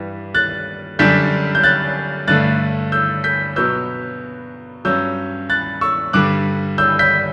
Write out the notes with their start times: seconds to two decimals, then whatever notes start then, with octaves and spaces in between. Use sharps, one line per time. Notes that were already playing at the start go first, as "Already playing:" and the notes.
Already playing: G2 E3 G3
0.35 F#6 A6
0.99 F#2 D3 G3 D4 G6 B6
1.55 G6
1.63 F#6 A6
2.28 G2 D3 A3 F#6 A6
2.92 E6 G6
3.24 G6 B6
3.56 B2 F#3 B3 E6 G6
4.85 G2 F#3 C#4 E6 G6
5.50 F#6 A6
5.81 C#6 E6
6.13 G2 D3 G3 D6 F#6
6.78 E6 G6
6.99 G6 B6